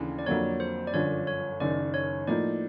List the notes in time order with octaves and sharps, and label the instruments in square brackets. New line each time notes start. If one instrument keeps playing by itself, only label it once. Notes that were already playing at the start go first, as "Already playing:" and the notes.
Already playing: [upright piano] D#2 C#3 E3 A3 D4
[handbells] D5
[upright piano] F2 D3 F#3 A#3 [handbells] C#5
[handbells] C5
D5
[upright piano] G1 F#2 D3 F3 [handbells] C#5
[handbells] C#5
[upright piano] F#1 F#2 D#3 [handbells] D5
[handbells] C#5
[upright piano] A2 F3 A#3 D#4 [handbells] D5